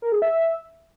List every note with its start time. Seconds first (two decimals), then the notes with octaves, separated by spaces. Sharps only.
0.02 A#4
0.12 G#4
0.22 E5